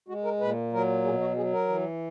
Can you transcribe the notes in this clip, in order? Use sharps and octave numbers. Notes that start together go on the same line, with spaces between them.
G#3 F#4
A#4
A#2 B4
F#3 A#4
B2 G#4
F#4
F#3 G#4
A#4
E3